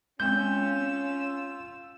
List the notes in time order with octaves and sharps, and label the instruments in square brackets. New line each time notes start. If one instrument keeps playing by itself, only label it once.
[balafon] G#3 C4 [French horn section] C#4 [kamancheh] F4 E6 [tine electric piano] G6